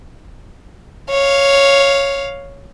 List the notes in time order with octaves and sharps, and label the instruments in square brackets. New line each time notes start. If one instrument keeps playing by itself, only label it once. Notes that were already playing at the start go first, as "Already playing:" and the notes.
[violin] C#5 F5